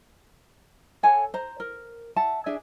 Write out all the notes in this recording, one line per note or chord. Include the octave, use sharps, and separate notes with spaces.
A4 C#5 F#5 G#5
C5 A#5
A#4
E5 F#5 A5
D4 G#4 E5 G#5